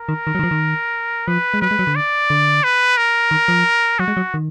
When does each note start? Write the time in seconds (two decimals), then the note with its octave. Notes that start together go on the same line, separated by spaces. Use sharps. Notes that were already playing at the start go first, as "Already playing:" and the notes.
Already playing: A#4
0.09 D#3
0.27 D#3
0.35 F#3
0.39 D#3
0.43 F3
0.51 D#3
1.28 F3 B4
1.54 G#3
1.61 F#3 B4
1.71 G#3
1.79 F#3
1.87 D3
1.96 D5
2.30 D3
2.64 B4
2.97 A#4
3.31 D#3
3.48 F3
3.99 F#3 F#4
4.08 G#3
4.17 F#3
4.34 D#3